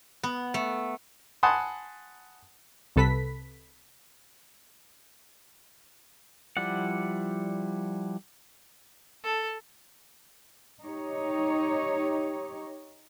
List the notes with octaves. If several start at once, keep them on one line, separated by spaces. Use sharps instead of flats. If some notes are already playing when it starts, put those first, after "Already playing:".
B3
A3
F#5 G#5 A5 B5 C6 D#6
C2 C3 A4 B4 B6
F3 G3 E4 D5 F#5
A4
D#4 G4 C#5